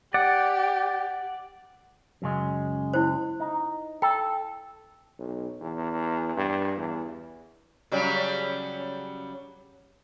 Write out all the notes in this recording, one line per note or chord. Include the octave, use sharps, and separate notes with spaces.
G4 D5 F#5
F#2 C#3 G#3
E4 C5
D#4
A4 G5
B1
E2
G2
E2
C#3 F#3 G3